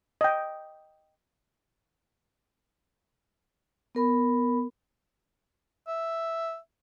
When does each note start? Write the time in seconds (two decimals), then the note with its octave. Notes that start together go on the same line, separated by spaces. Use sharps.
0.21 D#5 G5
3.95 B3 A#4 B5
5.87 E5